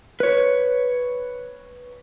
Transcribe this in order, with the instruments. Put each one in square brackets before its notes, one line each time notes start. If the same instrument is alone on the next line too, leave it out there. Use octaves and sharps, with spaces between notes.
[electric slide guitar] B4 C#5